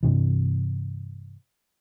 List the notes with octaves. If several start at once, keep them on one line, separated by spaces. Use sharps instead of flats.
G2 C3 E3